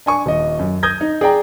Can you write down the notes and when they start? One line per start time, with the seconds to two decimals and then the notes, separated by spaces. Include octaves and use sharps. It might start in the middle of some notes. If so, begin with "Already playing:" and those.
0.06 D4 G#5 C#6
0.26 D#1 D#5
0.59 F#2
0.83 D#6 G6 G#6 A#6
1.01 D#4
1.21 G#4 D5 G5 A#5